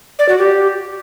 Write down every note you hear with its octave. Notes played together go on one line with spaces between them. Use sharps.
D5
F#4
G4